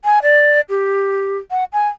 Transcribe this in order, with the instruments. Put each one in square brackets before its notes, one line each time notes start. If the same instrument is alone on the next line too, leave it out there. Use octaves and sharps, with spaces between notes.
[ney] G#5
D5
G4
F#5
G#5